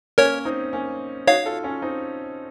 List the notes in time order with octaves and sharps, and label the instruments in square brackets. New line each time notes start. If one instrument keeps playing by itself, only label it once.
[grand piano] A#3 C#4 [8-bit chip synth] A#4 C#5
[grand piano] C4 D#4
A#3 C#4
[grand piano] D#4 F#4 [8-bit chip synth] C#5 F5
[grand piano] F4 A4
C#4 F4
C4 D#4